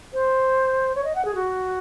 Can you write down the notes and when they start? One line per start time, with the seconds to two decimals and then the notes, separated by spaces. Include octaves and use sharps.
0.13 C5
0.95 C#5
1.05 D#5
1.15 F#5
1.25 G#4
1.35 F#4